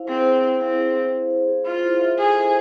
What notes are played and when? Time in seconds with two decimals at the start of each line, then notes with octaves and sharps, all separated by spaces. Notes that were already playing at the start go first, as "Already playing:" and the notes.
Already playing: E4 C5 F5
0.08 C4 G#4
0.26 C5
0.44 E4
0.61 C4 F5
0.78 G#4
0.97 C5
1.13 E4
1.30 F5
1.48 G#4
1.65 F4 C5
1.83 E4
2.01 E5
2.18 G#4 A4
2.36 C5